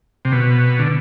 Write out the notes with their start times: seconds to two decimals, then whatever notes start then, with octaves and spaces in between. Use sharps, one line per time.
0.25 C3
0.32 B2
0.79 D3